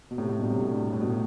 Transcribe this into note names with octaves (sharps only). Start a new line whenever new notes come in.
B2
A2 C3
A2
G2 B2
A2 C3
A2
G2
A2
A2
B2
A2